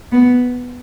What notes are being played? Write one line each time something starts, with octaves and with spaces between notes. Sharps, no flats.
B3